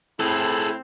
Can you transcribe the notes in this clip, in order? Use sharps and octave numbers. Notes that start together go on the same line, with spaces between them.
A2 C4 E4 G#4 A4